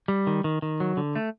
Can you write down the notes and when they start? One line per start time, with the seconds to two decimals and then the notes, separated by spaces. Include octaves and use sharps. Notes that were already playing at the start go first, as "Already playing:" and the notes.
0.08 G3
0.27 D#3
0.44 D#3
0.62 D#3
0.80 F#3
0.97 D3
1.15 A3